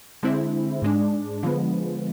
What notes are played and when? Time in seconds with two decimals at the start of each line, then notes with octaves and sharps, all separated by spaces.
0.23 D3 G#3 C4 E4
0.82 G#2 G#3 D4
1.43 D3 F3 G#3 B3